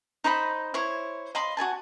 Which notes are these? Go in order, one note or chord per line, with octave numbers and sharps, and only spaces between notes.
D#4 C5 D#5 B5
E4 C5 C#5
D#5 F5 B5 C6
F#4 A4 G#5 A5